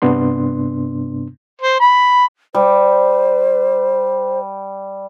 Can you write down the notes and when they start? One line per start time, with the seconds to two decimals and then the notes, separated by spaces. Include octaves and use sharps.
0.02 G2 C3 B3 D4 C6
1.61 C5
1.80 B5
2.54 G3 C5